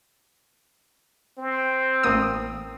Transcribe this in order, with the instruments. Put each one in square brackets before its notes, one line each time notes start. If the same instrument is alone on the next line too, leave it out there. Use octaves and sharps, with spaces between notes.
[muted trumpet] C4
[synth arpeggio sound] A1 A#3 D#6